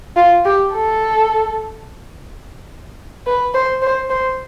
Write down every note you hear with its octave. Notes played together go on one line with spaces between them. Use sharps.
F4
G4
A4
B4
C5
C5
C5